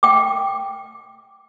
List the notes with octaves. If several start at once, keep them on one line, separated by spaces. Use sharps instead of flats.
G5 D6